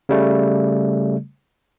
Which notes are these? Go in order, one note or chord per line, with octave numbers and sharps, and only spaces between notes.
C#3 G3 A3